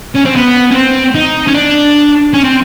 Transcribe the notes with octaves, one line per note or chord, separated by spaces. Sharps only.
C#4
C4
B3
C#4
C4
D#4
C#4
D4
C#4
C4